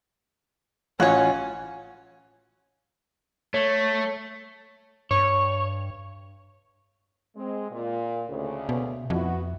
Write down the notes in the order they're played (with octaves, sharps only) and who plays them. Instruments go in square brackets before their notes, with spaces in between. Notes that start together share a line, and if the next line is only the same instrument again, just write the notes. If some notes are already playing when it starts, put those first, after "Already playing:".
[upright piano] A1 F4 F#6 [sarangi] C#4 [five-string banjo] F#4 C#5
[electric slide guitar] A3 [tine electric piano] C#5
[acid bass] G2 [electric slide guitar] C#5
[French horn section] G#3 C4
A#2
D2 C#3
[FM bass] B2
[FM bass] F2 [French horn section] B3 E4 F#4